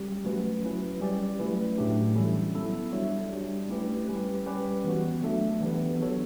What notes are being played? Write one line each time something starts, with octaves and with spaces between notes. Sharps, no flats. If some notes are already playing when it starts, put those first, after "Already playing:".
Already playing: G3 C#4 G4
F#3 A3 C#4 F#4 B4
F#3 C#4 E4 B4
G3 C#4 G4 D5
F#3 A3 C#4 E4 B4
A2 F#3 A3 D4 G4
E3 G3 C#4 E4 A4
F#3 B3 E4 A4
G3 D4 F#4 C#5 E5
G3 D4 G4
A3 C#4 E4 G4 B4
G3 C#4 G4 B4
G3 C#4 G4 B4
E3 B3 F#4
F#3 A3 D4 A4 E5
E3 B3 D4 G4 B4
F#3 B3 F#4 A4 C#5